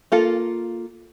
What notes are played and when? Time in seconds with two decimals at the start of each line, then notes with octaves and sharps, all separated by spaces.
0.12 A#3 F4 A4